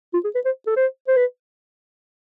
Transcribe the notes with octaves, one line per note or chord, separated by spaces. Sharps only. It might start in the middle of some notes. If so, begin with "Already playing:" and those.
F4
G#4
B4
C5
A4
C5
C5
B4